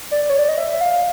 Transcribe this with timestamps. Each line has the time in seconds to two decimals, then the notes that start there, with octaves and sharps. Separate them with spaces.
0.11 D5
0.30 C#5
0.39 D5
0.49 D#5
0.58 E5
0.81 F5